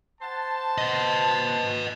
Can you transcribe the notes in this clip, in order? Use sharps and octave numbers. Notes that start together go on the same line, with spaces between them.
C5 F#5 A5
B4 D#5